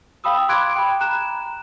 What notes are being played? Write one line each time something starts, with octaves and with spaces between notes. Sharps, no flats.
F5 G5 B5 D#6 E6
B5 C6 D6 F#6 G#6 D7
G5 B5
A#5 F#6 E7